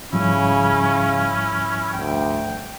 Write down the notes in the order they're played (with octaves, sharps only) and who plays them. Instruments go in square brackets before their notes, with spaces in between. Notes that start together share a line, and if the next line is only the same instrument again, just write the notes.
[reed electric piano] G#2 F3 G3 [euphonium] C#3 [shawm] C#4 [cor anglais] E4
[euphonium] D2 [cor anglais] G5